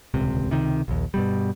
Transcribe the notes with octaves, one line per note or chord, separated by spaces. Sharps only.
D#1 C#2 C3
C#2 C3 D#3
A#1 D#2
G2 B2 G3